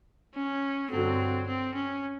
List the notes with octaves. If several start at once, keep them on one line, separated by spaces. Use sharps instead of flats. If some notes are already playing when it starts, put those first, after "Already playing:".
C#4
G2 D3 F#3 C4
C4
C#4